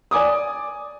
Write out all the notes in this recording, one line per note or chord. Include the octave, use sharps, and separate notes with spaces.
D5 G#5 D6 D#6